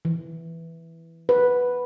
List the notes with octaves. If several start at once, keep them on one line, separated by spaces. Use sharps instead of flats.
E3
B4